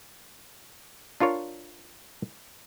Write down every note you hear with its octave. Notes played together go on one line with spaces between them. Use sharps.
D4 F4 A#4 C#5